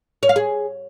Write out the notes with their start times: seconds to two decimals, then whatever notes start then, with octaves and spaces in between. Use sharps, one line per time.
0.23 C#5
0.29 F5
0.36 G#4